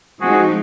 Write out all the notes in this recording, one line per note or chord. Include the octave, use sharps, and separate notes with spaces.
F3 G#3 C4 D#4 F#4 G#4